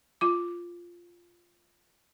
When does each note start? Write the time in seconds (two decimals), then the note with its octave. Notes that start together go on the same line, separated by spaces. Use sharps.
0.21 F4 D6